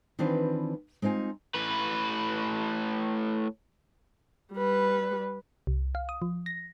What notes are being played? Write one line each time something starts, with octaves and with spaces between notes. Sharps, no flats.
D#3 E3 C4 D4 F4 B4
G#3 C4 D#4 F4 G#5
A2 B4
G3 B4
C2
F5
D#6
F3
A#6